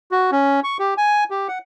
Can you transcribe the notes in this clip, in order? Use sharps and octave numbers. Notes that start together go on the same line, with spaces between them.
F#4
C#4
C#6
G4
G#5
G4
F#5